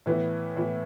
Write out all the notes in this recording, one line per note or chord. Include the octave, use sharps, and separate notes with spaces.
A2 E3 B3 E4
A2 E3 B3 E4